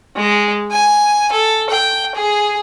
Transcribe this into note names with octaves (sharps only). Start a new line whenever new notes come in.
G#3
G#5
A4
G5
G#4